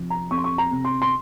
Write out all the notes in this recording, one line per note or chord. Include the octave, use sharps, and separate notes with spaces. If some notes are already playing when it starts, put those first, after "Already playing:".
Already playing: C3 F3
A#5
F2 C#6
C6
C#6
A#5
C3
C6
C6